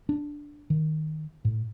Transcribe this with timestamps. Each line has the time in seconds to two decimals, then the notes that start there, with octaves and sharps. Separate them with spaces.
0.09 D4
0.70 D#3
1.45 A2